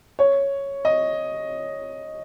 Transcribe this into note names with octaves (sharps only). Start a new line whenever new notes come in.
C#5
D#5